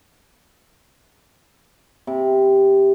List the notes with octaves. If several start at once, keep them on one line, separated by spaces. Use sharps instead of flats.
C3